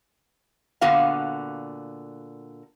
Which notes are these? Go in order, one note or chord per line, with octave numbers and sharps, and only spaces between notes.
A#2 D3 B3 F#4 F5